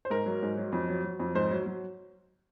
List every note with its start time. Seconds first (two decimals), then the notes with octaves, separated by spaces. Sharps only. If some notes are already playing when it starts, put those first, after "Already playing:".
0.05 C5
0.10 G#2 A#4
0.26 F#3
0.42 G#2
0.57 F#3
0.72 F2
0.89 F#3
1.04 F#3
1.20 F2
1.35 G#2 C5
1.51 F#3
1.66 F#3